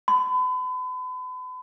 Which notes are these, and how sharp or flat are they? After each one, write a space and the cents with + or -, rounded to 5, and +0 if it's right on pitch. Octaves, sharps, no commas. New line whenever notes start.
B5 +40